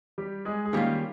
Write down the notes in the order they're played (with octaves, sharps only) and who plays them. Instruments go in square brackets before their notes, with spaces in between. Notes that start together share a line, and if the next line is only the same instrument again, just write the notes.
[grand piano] G3 G4
G#3 G#4
G#4
[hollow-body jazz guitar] D#3 A#3 C#4 F4 [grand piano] G3 G4